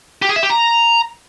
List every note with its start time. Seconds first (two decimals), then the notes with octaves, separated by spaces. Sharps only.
0.22 G4
0.29 G#4
0.36 E5
0.43 G4
0.50 A#5